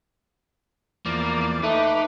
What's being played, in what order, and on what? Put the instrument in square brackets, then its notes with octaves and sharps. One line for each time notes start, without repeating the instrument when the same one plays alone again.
[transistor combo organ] E2 F3 D5 [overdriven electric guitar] A#3
[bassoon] A3 [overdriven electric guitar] D#4 [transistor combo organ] B4 D6